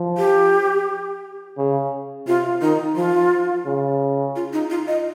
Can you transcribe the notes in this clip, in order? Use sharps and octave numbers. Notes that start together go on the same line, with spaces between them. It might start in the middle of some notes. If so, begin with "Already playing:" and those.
Already playing: F3
G4
C#3
C3 F4
D#3 D#4
F3 F4
C#3
F4
D#4
F4
D#5